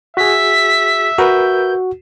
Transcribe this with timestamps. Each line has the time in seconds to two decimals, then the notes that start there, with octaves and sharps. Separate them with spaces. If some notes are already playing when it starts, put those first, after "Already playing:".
0.17 F#4 G#4 E5 B6
1.18 F#4 A#4 B4 G6